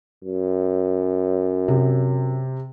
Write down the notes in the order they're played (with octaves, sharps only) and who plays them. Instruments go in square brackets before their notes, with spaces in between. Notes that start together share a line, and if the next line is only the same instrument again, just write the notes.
[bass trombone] F#2
[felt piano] C3